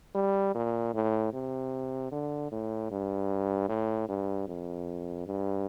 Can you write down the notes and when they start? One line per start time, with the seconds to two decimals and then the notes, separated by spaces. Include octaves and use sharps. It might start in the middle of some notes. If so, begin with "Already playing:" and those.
0.15 G3
0.55 A#2
0.94 A2
1.33 C3
2.12 D3
2.52 A2
2.91 G2
3.69 A2
4.09 G2
4.48 F2
5.27 G2